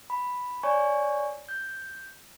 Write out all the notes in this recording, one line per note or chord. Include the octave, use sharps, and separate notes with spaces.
B5
C#5 D5 G#5 C#6
G6